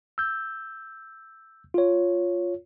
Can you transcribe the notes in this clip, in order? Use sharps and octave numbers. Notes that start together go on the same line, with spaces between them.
E6 G6
F4 C#5